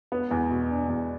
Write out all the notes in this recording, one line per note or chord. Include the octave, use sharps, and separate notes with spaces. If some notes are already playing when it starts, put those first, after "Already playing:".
B3
E2
B2
D4
E2